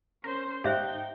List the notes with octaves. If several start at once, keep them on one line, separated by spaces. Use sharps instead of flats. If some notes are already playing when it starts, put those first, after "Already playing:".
C#4 A#4 C5
G#2 D#4 G4 C5 E5 F5 G5